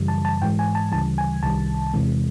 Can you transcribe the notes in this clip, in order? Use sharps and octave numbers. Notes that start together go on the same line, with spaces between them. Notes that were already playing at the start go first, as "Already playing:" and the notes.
Already playing: F#2 C#3 E3 G3
A5
A5
G#2 E3 G#3 G5
G#5
A5
D2 C#3 E3 G3 A5
G#5
C2 C3 D#3 G3 A5
E2 C3 E3 G#3